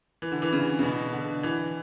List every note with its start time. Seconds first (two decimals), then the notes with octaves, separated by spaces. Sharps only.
0.22 E3
0.32 D3
0.42 E3
0.53 C#3
0.79 C#3
0.83 B2
1.13 D3
1.43 E3